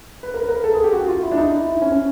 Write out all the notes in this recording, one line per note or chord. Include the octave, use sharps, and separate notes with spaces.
B4
A#4
B4
A#4
A4
G#4
G4
F#4
F4
E4
D4
D#4
E4
E4
C#4
C#4